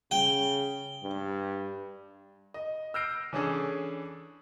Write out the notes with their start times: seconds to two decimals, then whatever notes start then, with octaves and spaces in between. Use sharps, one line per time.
0.11 C#3 G5
1.03 G2
2.54 D#5
2.94 E6 F6 G6 A#6 C7 D7
3.33 E3 C#4 D4 G#4 A4